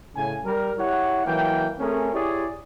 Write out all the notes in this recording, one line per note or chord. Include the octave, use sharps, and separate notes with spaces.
A2 C#3 G#5
G3 A#4
E4 G4 C#5 F#5
E3 F#3 A#3 G5
A3 C4 C#4 G#4 A#4
E4 G4 G#4 C#5 D5